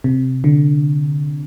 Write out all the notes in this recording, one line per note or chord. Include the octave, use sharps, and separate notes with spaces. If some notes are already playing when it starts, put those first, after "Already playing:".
C3
D3